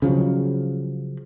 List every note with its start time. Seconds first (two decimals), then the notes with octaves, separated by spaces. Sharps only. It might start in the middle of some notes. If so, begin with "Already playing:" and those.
0.02 C#3 F3 F#3